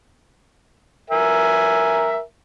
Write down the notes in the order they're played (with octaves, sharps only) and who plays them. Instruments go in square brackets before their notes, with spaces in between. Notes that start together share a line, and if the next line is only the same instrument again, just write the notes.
[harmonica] A#4 E5 G#5